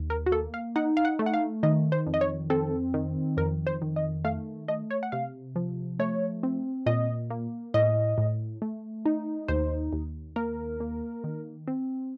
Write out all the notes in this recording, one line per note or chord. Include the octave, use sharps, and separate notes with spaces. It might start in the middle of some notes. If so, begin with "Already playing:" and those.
Already playing: D#2
A#4
F#4
A#3 A4
F5
D#4 F#5
F5
F#5
A3
F#5
F5
D#3 D#5
C5
F2
D#5
C#5
C4 A4
D#3
F2 A#4
C5
D#3
D#5
A3 F5
A3 D#5
C#5
F#5
C3 F5
F3
A3 C#5
C4
A#2 D#5
A#3
A2 D#5
A2
A3
D#4
D#2 C5
D#2
A#3 A#4
A#3
D#3
C4